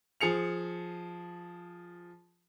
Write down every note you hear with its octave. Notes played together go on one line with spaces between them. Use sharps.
F3 G#4 C#7 F7